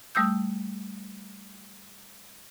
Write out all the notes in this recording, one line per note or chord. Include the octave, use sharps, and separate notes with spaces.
G3 A3 D#6 E6 G6